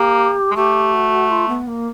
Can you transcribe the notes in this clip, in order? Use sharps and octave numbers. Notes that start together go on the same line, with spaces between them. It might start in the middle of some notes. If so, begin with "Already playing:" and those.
Already playing: A#3 G4
G#3
A3 G4
F#4
F4
B3
A#3